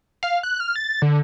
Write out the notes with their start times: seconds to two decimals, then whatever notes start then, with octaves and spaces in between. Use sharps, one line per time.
0.23 F5
0.43 F#6
0.60 F6
0.76 A6
1.02 D3